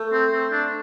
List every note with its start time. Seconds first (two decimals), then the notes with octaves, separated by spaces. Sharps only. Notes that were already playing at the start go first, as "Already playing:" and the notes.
Already playing: A3
0.12 C4
0.32 C4
0.51 D4